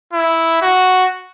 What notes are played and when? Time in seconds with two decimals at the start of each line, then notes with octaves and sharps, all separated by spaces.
0.13 E4
0.62 F#4